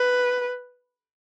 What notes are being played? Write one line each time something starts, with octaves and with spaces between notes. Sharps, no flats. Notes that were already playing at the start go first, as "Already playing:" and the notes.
Already playing: B4